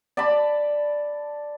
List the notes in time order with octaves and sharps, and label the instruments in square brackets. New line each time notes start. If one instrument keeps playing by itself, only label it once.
[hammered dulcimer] D5 A5 B5